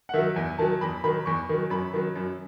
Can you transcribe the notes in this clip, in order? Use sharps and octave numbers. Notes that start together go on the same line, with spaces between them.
F#5
D#3 F#3 E5
E2 G#5
D#3 F#3 A5
E2 B5
D#3 F#3 B5
E2 C#6
D#3 F#3
F#2 B5
D#3 F#3
F#2